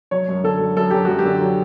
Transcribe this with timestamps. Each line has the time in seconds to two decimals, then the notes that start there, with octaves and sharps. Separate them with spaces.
0.11 F#3 C#5
0.28 F#2
0.44 D3 A4
0.60 F#2
0.76 F#2 A4
0.91 F#3 G4
1.05 F#2 F#4
1.19 G4
1.25 D3
1.41 F#3